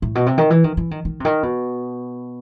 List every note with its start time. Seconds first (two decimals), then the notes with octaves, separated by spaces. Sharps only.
0.02 A2
0.15 B2
0.26 C3
0.38 D#3
0.50 E3
0.64 D#3
0.77 E3
0.91 D#3
1.05 D#3
1.20 C3
1.25 D#3
1.43 B2